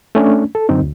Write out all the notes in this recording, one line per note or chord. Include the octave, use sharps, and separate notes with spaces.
A3 C#4 D4
A4
F#2 D3 C4 D#4
D2